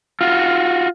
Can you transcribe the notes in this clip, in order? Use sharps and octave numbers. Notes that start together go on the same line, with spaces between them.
F4 F#4